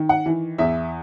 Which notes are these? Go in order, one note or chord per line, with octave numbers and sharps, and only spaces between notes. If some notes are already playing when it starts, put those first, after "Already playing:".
Already playing: D#3
F#5
E3
E2 E5